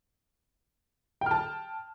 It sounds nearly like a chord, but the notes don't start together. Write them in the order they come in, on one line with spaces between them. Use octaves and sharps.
G5 F6 A5